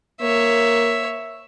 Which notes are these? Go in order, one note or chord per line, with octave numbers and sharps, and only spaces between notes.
A#3 C#5 E5